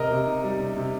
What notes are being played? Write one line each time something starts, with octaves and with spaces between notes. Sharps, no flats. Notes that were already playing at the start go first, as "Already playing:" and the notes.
Already playing: C3 A#4 D#5
C3
D#4
G3
C3
C3